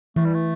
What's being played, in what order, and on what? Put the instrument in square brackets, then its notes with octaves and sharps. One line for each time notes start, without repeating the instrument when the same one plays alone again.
[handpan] E3 [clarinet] A3
[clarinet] G3
A3